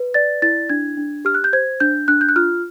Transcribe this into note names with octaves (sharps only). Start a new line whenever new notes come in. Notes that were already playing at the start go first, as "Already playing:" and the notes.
Already playing: B4
D5 A6
E4 A6
D4 G#6
D4
G4 F6
F#6
G6
C5 G#6
D4 G6
D4 F#6
G6
F#6
F4 F6